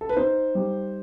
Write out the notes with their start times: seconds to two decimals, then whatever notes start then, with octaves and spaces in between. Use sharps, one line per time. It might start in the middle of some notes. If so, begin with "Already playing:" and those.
0.01 A4
0.09 B4
0.16 D#4 C5
0.55 G3